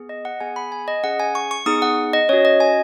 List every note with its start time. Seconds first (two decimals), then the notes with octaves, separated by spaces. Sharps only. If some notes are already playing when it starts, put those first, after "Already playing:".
Already playing: B3 G#4
0.09 D#5
0.25 F#5
0.40 B3 G#4 G#5
0.56 B5
0.72 G#5
0.88 D#5
1.03 C#4 G#4 F#5
1.20 G#5
1.35 C#6
1.51 C#6
1.66 B3 D#4 G#4 D#6
1.82 F#5
2.13 D#5
2.29 C#4 F#4 C#5
2.45 D#5
2.60 G#5